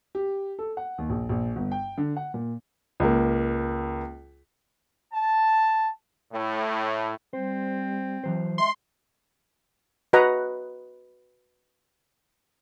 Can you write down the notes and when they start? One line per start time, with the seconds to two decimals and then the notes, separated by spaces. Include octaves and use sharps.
0.15 G4
0.59 A4
0.77 F#5
0.98 D#2
1.10 A#1
1.29 A#1
1.56 G1
1.72 G5
1.98 D3
2.16 F#5
2.34 A#2
3.00 C#2 A#3
5.13 A5
6.33 A2
7.33 G3 C4 C5
8.24 E3 F#3 C5
8.58 G#3 E5 C6
10.13 F#4 B4 D#5 F#5 A#5